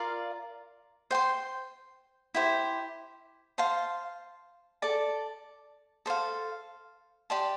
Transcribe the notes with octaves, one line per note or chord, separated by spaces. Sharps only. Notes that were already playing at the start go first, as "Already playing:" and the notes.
Already playing: F4 A#4 D5 F5
C5 G5 C6
E4 G4 C5
C5 F5 A5 C6
A4 D5 A5
A4 C5 F5
G4 D5 A5 C6